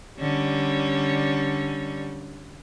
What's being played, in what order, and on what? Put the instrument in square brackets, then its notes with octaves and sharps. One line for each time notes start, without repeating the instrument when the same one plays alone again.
[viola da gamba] D3 G3 C#4